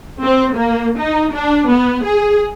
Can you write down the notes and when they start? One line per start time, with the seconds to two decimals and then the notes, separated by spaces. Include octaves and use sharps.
0.23 C4
0.55 A#3
0.98 D#4
1.33 D4
1.70 B3
2.04 G#4